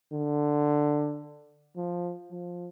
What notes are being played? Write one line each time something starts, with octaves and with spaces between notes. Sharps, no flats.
D3
F3
F3